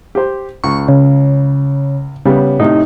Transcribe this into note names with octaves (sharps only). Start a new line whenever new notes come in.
G4 C5
C#2 C#6
C#3
C#3 G3 B3
A2 C3 D#4